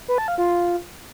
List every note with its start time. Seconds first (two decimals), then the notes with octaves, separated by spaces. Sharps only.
0.08 B4
0.18 A5
0.28 F5
0.38 F4